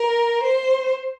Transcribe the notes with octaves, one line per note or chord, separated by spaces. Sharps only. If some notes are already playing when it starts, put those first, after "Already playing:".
Already playing: A#4
C5